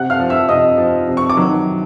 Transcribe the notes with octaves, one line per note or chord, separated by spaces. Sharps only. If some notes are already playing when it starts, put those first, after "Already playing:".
Already playing: C3 F#5 F#6
F5 F6
F3
E5 E6
C3 D#5 D#6
F3
C3
C#6
D6
D#3 F#3